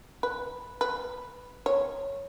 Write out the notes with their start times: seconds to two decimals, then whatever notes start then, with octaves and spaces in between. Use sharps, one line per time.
0.23 B4
0.81 B4
1.66 C#5